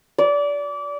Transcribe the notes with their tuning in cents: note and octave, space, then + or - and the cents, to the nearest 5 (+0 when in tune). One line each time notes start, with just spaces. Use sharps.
D5 -25